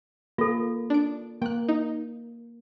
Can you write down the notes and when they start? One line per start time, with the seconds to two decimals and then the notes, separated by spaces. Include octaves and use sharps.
0.38 A#3 F4 A4
0.90 D4 D7
1.42 A#3 G5 F#6
1.68 D#4